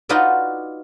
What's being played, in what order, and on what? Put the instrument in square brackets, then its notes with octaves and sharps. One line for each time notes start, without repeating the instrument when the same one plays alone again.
[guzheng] D#4 F4 F#4 B4 D5